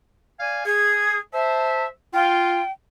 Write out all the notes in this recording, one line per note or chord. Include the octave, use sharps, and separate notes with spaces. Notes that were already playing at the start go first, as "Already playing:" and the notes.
D5 F5 G#5
G#4 G#6
C5 E5 A5
F4 G5